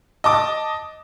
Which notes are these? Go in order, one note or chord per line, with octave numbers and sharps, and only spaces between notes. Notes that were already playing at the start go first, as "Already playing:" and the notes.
D#5 A5 D6